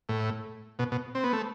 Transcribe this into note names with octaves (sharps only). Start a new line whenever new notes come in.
A2
B2
B2
C4
B3
A3